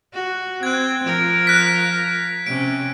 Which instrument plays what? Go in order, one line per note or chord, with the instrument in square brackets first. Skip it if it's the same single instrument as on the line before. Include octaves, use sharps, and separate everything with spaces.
[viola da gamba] F#4
[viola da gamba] C4 [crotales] F#6 G#6
[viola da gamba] F3 A#4
[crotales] F#6 B6
[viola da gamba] C3 C#4 [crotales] D7